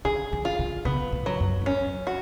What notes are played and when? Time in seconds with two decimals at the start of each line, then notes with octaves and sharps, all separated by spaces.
0.05 D3 G#4
0.33 D3
0.45 F4
0.59 D3
0.85 C#3 B3
1.12 A2
1.26 F#3
1.40 F#2
1.62 G#2
1.66 F#2 C#4
2.07 F#4